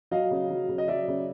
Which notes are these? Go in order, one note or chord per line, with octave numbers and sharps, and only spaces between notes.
F#3 D#5 F5
C#3
F#3
C#3
D#5
F#3 D5 E5
C#3